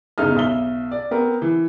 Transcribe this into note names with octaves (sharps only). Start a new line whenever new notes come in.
G1 E2 C#3 D#4 D#6 F6
B1 E5 G7
D5
B3 C4 A#4
E3